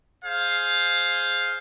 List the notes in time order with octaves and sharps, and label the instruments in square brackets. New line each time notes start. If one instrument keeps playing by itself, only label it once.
[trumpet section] G#4 C5 F5